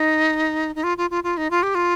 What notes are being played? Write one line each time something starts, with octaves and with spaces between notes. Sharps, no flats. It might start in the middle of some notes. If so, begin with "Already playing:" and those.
Already playing: D#4
D#4
F4
F4
F4
F4
D#4
F4
G4
F4